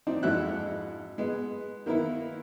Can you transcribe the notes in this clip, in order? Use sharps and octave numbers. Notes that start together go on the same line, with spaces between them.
C4 D4 D#4
F2 G#2 E4 F#4 E5 F#6
G#3 B3
D#3 A#3 B3 E4